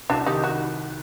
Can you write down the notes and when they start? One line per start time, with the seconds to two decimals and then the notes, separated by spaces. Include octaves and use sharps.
0.09 C2 D4 F#4
0.26 D#3 D#4 G4
0.44 F#4